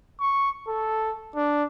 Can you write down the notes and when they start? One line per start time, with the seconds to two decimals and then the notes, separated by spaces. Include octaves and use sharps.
0.20 C#6
0.68 A4
1.35 D4